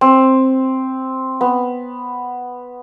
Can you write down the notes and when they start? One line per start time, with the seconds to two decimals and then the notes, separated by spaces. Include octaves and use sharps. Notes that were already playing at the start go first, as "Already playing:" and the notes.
0.01 C4
1.41 B3